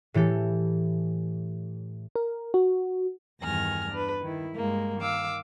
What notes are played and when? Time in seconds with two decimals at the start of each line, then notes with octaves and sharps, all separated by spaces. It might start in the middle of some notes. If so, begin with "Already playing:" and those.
0.14 A2 E3 G4 A4
2.15 A#4
2.54 F#4
3.41 E2 G2 D#3 G#5 F6 A#6
3.90 D4 B4
4.23 D#3 E4
4.55 G2 G#3 A#3
4.99 D#3 F5 D6 E6